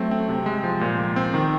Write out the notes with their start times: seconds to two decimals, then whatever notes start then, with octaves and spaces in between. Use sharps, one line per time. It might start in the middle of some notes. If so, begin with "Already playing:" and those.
Already playing: F#3 A3 C4
0.11 C4
0.29 C3
0.46 G#3
0.64 F3
0.81 A#2
0.99 A#2
1.16 C4
1.34 D#3